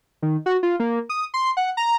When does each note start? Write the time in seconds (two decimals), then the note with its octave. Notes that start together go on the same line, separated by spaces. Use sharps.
0.22 D#3
0.46 F#4
0.63 F4
0.80 A#3
1.09 D#6
1.34 C6
1.57 F#5
1.77 A#5